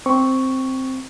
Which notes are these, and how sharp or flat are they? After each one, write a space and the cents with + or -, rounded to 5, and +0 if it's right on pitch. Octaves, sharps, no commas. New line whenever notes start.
C4 +0 C#6 +0